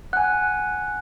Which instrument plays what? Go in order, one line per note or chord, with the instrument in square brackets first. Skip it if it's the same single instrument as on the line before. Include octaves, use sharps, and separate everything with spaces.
[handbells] F#5 G#5 [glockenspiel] F#6